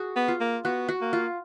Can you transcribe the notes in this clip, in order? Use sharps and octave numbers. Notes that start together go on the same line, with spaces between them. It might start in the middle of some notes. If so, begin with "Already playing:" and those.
Already playing: F#4 G#4
B3
F4
A#3
B3 F#4
F#4
A#3
F4